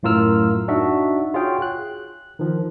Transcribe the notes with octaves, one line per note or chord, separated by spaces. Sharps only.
F#2 A2 F4 A#4 E6 F6
D4 D#4 F#4 E5
F4 F#4 G#4 C#5 F5 G5
F#6
D#3 F3